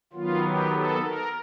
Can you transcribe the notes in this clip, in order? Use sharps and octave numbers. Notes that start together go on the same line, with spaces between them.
D#3 F#3 B3 F4
G4
A4
A#4